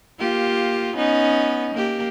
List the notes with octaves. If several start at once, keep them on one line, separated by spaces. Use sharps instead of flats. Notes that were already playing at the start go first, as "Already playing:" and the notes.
A#3 F4 G4
B3 C#4 D#4
A#3 G4